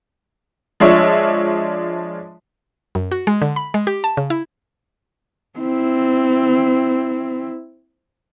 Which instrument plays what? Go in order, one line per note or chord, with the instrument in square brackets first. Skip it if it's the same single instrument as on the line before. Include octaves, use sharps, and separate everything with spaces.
[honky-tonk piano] F3 G#3 D4 C#5 E5
[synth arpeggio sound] F#2
F#4
G#3
D3
B5
G#3
G4
A5
C#3
E4
[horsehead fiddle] C4 E4